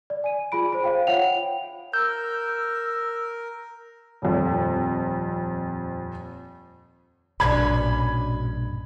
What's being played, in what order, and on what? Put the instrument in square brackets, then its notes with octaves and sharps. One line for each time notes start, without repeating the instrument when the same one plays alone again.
[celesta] D5
G#5 D#7
F4 G#4 B5 D7
C5 B5
C5 F5 G5
F4 C#5 E5 F#5 G5 F7
[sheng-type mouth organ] A#4 [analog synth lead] E6 [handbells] G6
[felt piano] D#1 F2
[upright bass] A#1 G2 [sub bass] B2 [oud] C#4 D4 B4 [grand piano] B5 G#6